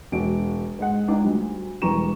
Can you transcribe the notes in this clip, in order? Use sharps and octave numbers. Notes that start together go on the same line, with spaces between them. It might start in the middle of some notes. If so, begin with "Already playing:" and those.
E1 F#4 D7
G#2 G#3 F#5
C#2 D4 D#4
D2 G3
E1 E3 G3 A#5 C#6 E7